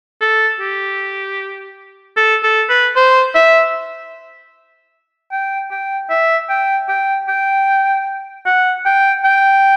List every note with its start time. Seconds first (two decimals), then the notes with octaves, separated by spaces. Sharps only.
0.21 A4
0.60 G4
2.17 A4
2.43 A4
2.69 B4
2.96 C5
3.35 E5
5.32 G5
5.71 G5
6.10 E5
6.50 G5
6.89 G5
7.28 G5
8.46 F#5
8.85 G5
9.25 G5